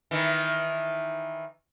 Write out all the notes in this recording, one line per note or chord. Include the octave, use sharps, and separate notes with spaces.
D#3 E3